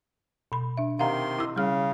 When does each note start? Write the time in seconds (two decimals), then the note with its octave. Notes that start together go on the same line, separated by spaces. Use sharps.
0.52 B2 B5
0.77 D4 E5
0.99 C3 D#3 F5 F#5 A#5 C6
1.39 E4 E6
1.56 C#3 G3 F6